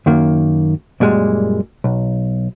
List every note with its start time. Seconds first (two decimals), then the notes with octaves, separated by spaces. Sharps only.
0.06 F#2 D#3 A#3
1.00 F#2 A#2 G3 G#3
1.84 B1